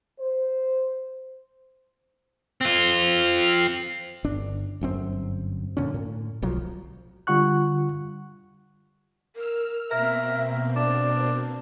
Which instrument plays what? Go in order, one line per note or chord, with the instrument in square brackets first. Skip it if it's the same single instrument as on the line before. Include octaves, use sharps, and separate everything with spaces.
[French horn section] C5
[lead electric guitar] C4 F4
[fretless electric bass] G1 D4
G1 F#2 C4
F2 A#2 D3 C#4
A2
D1 B1 F3 F#3
[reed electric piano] D3 G3 F4 F#5 C#6 F#6
[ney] A#4 [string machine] E6 F6
[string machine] B2 A#3 C4 [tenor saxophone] A#4 [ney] E5
[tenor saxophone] D4 [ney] D5